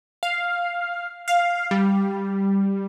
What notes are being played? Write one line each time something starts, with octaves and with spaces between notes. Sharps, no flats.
F5
F5
G3